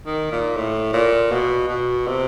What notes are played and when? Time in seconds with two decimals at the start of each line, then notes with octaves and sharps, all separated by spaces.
0.06 D#3
0.31 A#2
0.56 A2
0.93 A#2
1.31 B2
1.68 B2
2.07 C3